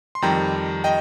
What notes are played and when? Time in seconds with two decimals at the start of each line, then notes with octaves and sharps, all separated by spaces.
0.15 C6
0.22 F2 D#3 G3 G5 A#5
0.84 D#5 G5